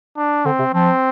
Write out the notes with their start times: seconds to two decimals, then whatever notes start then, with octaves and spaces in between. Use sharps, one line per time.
0.17 D4
0.45 D3 C4
0.59 C3
0.73 F3 C4